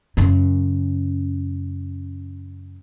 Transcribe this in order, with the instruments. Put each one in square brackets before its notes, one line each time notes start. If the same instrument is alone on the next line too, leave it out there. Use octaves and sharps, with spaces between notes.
[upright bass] F#2 C#3